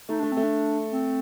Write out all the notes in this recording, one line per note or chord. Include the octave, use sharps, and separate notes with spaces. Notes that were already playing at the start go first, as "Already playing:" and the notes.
A3 D#4
A3 D4
A3 C4
D4
C4